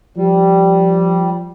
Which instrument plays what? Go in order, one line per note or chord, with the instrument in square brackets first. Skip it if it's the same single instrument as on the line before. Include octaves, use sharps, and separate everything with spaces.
[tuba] F3 [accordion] G3